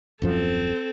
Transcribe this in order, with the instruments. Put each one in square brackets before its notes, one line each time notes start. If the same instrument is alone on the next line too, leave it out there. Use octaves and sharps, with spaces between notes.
[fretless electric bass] D#1 F#2 F3 [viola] C4 A4